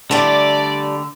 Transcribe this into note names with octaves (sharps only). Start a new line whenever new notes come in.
D3 G3 A3 D5